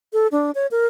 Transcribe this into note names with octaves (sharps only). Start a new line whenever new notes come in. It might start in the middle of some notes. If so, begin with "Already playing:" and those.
A4
D4
C#5
A#4